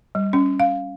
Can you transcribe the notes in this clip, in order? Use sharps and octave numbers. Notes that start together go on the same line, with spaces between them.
G3
C#4
F5